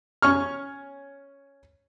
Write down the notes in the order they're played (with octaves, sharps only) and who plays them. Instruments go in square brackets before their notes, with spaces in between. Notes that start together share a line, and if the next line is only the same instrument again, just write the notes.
[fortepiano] C#4 C#5 C#6 F6